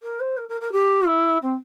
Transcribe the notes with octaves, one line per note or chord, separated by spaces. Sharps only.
A#4
C5
A#4
A#4
A#4
G4
E4
C4